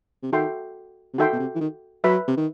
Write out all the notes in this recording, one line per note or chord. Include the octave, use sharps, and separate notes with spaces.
C3
D#3 F#4 A4 E5 G5 C6
C3
D#3 F#4 A4 E5 G5 C6
B2
C3
E3
D#3
F#3 B4 E5 B5
C3
D#3